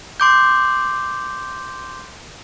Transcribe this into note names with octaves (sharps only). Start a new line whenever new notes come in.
C6 D6 G6